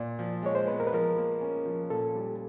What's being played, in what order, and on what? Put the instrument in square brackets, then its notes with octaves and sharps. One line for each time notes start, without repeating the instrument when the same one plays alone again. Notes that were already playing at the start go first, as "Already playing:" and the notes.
Already playing: [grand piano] A#2 [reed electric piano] D5
[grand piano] F3
[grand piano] G#3 [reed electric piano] C#5
[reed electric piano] C5
[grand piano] B3 [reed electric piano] B4
[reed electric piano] A#4
B4
[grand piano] F3 [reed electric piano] A#4
[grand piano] A#3
C#4
F3
[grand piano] A#2 [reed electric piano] A4
[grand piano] G3